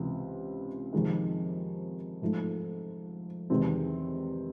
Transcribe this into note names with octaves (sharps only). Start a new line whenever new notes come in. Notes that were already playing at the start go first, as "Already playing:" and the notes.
Already playing: C#2 C3 E3
F2 C3 D#3 G#3
G#2 F3 A3
E2 C3 D#3 G#3 C4